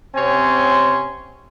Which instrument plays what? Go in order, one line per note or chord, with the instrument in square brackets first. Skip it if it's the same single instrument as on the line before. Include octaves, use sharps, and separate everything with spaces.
[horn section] C3 C4 C#4 C#5 G#5 C6